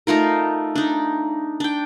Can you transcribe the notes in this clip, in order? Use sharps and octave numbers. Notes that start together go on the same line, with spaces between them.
A3 D#4 F4 A#4
D4 D#4
D4 G5